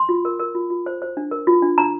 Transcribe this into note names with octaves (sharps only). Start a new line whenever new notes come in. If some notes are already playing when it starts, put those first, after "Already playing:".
Already playing: C6
F4
A#4
A#4
F4
F4
C5
C5
D4
A#4
F4
D4
D4 A#5